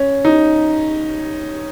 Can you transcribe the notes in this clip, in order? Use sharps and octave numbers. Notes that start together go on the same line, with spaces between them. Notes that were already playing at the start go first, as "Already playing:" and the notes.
Already playing: C#4
D#4